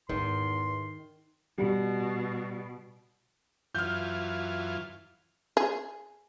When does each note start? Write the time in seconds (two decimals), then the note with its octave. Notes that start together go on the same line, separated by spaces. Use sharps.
0.09 E2 G#2 D#3 G#3 C6
1.58 B2 G3
3.75 F#2 E3 F4 F6 G6
5.57 G#4